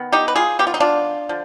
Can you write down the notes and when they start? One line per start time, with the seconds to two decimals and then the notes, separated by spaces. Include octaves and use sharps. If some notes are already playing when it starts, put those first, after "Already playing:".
Already playing: D#3 B3
0.12 D#4 G4
0.28 B4
0.36 F4 G#4
0.59 D#3 B3 G4
0.67 F4
0.74 D#4
0.80 D4 F4
1.29 D3 F3